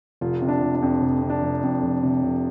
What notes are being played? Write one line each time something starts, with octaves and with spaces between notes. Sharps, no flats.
F1 F4
C3
D4
F1
D4
F2
F1
C3
D4
F1
F2
F1
C3
F1